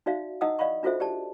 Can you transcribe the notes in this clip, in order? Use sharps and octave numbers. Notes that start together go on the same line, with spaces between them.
D#4 F#4 D5 E5 F5
D#4 E4 D#5 F#5 D#6 E6
D5 D#5 F5 F#5 B5 C#6
D4 F4 F#4 A4 C5 E5
G4 D5 A5